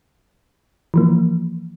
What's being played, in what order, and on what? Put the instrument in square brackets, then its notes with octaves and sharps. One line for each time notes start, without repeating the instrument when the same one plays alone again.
[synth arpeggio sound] E3 F3 A#3